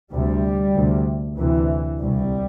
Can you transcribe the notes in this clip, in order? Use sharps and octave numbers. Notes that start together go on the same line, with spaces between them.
D2 C3 G3
D2 C3
D2 C3 E3
C2 C3 G3